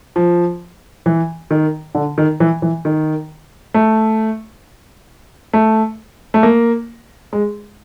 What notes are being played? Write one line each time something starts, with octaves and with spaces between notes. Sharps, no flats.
F3
E3
D#3
D3
D#3
E3
E3
D#3
A3
A3
A3
A#3
G#3